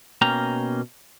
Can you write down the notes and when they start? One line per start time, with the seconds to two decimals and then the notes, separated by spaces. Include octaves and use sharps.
0.22 B2 A#3 C#4 G5 A#5